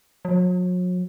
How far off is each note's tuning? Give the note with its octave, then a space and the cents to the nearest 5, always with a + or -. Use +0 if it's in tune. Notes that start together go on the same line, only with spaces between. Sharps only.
F#3 -40